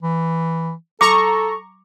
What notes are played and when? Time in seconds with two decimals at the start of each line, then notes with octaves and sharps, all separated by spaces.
0.02 E3
1.01 A4 A#5 C#6 D6